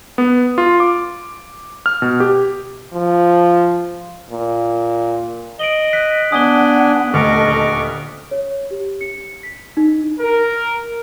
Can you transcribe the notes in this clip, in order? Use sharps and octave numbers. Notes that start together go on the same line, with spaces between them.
B3
F4
D6
F6
B2
G4
F3
A#2
D#5 D7 F#7 G7
F#6 B6
B3 D4 F#5 G#5 D#6 G7
D#1 D2 A4 D#5 C#6 D6 F6
C#5
G4
C#7
B6
D#4
A#4